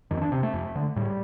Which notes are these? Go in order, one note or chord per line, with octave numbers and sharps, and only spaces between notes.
F2 D#3
C4
D4
C3 C4
A3
F2
D3
A2 G3